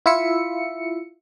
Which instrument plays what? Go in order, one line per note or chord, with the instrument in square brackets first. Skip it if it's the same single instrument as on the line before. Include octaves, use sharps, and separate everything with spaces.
[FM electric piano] E4 F4 E5 C#7